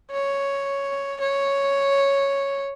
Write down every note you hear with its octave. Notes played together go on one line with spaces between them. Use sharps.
C#5
C#5